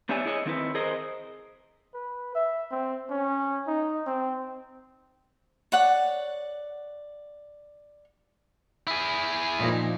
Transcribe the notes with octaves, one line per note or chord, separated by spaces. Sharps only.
B3 D4 G4 C#5 E5 G#5
E4 G#4 C#5 D#5
D#3 C4 E4 B4
G#4 A#4 C5 D#5
B4
E5
C4
C#4
D#4
C4
C#5 D5 F#5
E4 G#4
A#2 F3 D#4